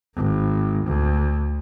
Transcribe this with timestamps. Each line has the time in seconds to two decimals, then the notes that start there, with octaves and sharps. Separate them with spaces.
0.16 G#1
0.85 D2